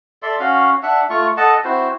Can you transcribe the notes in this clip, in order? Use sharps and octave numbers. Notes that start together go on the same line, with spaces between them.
A4 D5 E5 C6
C#4 F#4 F5
D4 E5 F#5
A3 F4 C#6
A4 D#5 F#5 A5
C4 E4 F#4 C5